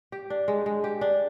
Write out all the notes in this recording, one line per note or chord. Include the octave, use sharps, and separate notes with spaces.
G4
D4
G#3
G#3
G4
D4